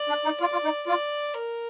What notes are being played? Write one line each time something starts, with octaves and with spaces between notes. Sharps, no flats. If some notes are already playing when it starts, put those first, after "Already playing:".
Already playing: D5
D4
D#4
F4 D5
F4
D#4
F4 D5
A#4